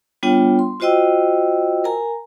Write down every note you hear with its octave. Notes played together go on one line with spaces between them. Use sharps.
G3 B3 D4 F4 C#5 G5
C6
F4 F#4 C5 D#5 G5 E6
A#4 G#5 A#5